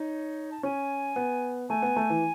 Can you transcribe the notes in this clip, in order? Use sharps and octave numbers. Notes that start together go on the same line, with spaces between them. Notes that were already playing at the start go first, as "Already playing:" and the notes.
Already playing: D#4 C#5
A5
C#4 G#5
B3
A3 G#5
B3
A3
E3